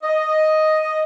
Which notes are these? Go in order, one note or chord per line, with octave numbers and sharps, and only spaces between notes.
D#5